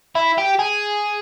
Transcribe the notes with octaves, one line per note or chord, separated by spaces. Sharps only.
E4
G4
G#4